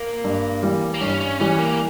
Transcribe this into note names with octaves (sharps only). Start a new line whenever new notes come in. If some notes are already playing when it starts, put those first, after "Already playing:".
Already playing: A#3
G2
E3 G3
A#3
G2 C#4
C#4
E3 G3 C#4
A#3